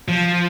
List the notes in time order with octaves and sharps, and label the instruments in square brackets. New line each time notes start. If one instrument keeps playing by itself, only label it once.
[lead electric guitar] F3